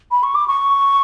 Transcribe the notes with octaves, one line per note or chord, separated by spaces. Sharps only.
B5
C#6
D6
C#6